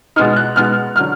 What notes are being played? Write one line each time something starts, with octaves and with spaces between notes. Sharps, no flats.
B2 G#3 B3 D#4 F6
F#6
B2 G#3 B3 D#4 F6
D3 F#3 F6